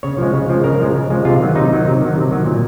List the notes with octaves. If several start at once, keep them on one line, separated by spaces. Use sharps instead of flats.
C#3 C#5
F3 G#3
C#3
F3 G#3
C#3 A#4
F3 G#3
C#3
F3 G#3
C3 F4
D#3 F#3
C3 D#4
D#3 F#3
C3
D#3 F#3
C3
D#3 F#3
A#2